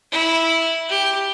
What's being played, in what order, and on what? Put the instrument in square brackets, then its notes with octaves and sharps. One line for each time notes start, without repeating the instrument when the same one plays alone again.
[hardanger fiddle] E4
G4